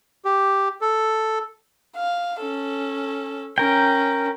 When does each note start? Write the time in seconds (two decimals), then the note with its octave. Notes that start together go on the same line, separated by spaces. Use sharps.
0.25 G4
0.81 A4
1.96 F5
2.40 C#4 A4
3.58 C#4 A#4 G5